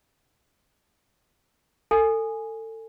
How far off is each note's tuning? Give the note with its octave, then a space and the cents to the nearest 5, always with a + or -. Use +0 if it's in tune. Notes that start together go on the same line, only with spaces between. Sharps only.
A4 +30 G#5 +0